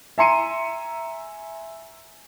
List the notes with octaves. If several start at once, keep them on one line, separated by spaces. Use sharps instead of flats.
E5 G#5 A#5 C6 C#7 D#7